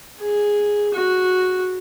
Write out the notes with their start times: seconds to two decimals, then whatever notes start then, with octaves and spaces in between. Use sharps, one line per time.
0.20 G#4
0.94 F#4